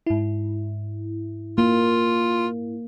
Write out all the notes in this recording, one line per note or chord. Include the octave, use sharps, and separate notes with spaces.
G#2 E4
A#3 F4